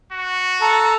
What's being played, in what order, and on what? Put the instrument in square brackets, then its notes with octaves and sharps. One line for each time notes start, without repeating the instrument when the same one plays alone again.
[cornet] F#4
[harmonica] A4 [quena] A#5